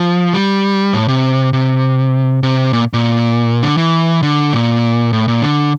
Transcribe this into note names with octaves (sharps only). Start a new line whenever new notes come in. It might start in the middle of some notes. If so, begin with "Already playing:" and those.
Already playing: F3
G3
A2
C3
C3
C3
A#2
A#2
D3
E3
D3
A#2
A2
A#2
D3